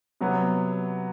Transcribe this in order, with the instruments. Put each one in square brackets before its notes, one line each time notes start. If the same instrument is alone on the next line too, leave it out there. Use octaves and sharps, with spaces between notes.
[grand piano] C3 F#3 B3